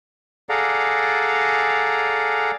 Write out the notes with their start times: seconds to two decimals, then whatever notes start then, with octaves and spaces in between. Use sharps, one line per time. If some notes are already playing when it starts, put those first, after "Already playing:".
0.49 G#4 A4 D5 F5 F#5 A#5